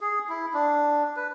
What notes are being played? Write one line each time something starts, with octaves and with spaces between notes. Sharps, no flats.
G#4
E4
D4
B4